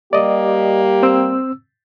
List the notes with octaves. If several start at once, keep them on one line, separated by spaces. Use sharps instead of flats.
G3 A#3 G4 D5 D#5
C4 E6